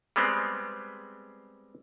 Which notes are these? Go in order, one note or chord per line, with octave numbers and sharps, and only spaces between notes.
G3 G#3 B3 C4